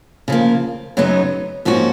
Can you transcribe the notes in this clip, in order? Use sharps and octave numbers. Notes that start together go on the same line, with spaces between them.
C#3 F3 A#3
F#2 C#3 F#3 B3 D#4
G#2 F3 A#3 C#4 F#4